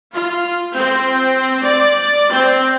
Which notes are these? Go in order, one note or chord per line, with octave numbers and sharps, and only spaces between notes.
F4
C4
D5
C4